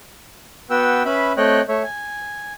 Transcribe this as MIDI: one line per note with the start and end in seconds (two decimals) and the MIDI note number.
0.70 1.03 59
0.70 1.03 66
0.70 1.03 71
0.70 1.03 79
0.70 1.03 88
1.05 1.32 61
1.05 1.32 71
1.05 1.32 76
1.05 1.32 83
1.37 1.61 57
1.37 1.61 60
1.37 1.61 73
1.37 1.61 75
1.37 1.61 79
1.37 1.61 90
1.68 1.82 57
1.68 1.82 73
1.68 1.82 76
1.84 2.53 80